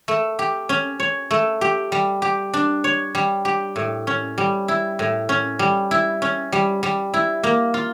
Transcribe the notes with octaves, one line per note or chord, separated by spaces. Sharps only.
A3
G4
C#4
C#5
A3
G4
G3
G4
D4
C#5
G3
G4
A2
C#4
G3
E4
A2
C#4
G3
E4
C#4
G3
G3
E4
A#3
F4